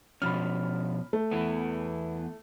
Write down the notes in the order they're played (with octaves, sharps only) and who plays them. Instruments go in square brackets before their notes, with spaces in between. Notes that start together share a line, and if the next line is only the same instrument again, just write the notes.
[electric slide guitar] B2 F3 C#4 [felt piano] B5 F6
[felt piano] A3
[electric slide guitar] E2 E3 B3